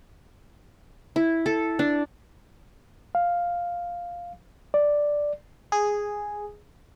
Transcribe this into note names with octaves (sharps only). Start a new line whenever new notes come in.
E4
A4
D4
F5
D5
G#4